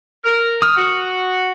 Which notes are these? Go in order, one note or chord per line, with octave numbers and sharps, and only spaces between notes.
A#4
D#6 F6
F#4